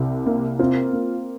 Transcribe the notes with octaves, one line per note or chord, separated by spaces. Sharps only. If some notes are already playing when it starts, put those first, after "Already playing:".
Already playing: C2 C3
A#3
C4 F4
A#3